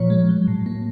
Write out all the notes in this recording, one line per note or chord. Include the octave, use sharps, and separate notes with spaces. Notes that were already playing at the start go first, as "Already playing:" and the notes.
Already playing: A#2 F3 C#5
G#3
F#3
A2
A#3